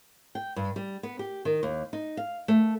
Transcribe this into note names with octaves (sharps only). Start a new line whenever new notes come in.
G5
G2
G3
B3
G4
D#3
D#2
D#4
F5
A3